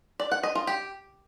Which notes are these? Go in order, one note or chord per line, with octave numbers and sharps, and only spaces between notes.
D5
F#5
D#5
F4
G4